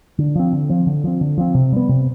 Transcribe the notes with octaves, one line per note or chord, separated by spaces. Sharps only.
D3
F3 C4
D3
F3 C4
D3
F3 C4
D3
F3 C4
C3
G3 B3
C3